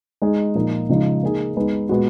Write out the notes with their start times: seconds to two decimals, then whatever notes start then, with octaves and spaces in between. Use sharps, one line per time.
0.22 G#3 D#4 G#4
0.55 A#2 F3 A#3 D#4
0.89 C#3 F3 G#3 D#4
1.23 A#3 D#4 G#4
1.57 G#3 B3 D#4 G#4 B4
1.89 A#2 G#3 B3 F#4